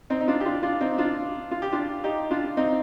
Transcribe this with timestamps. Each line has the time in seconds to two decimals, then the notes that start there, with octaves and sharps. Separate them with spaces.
0.10 C4 D#4
0.21 D#4
0.28 D4 F4
0.40 G4
0.45 D4 F4
0.63 D4 F4
0.80 C4 D#4
0.98 D4 F4
1.51 F4
1.62 G4
1.72 D4 F4
2.04 D#4 G4
2.31 D4 F4
2.57 C4 D#4